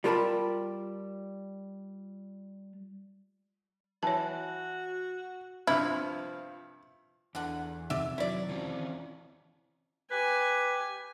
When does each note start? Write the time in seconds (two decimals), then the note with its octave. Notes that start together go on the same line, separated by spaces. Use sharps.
0.04 G3 F4 A#4 G#5 A5 B5
4.03 E3 F#4 C#5 A5
5.67 G2 C3 F3 E4 F6
7.35 E2 D3 F#5
7.90 F2 C3 D#3 F#3 D5 E5
8.18 F#3 E4 D5
8.49 E3 C4 C#4
10.11 G4 B4 G#5